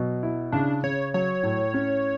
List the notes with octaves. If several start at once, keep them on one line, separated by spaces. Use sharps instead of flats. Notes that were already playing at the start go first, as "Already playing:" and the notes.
Already playing: B2 F#3
E4
C#3 D4
C#3 C#5
F#3 C#5
A2
C#4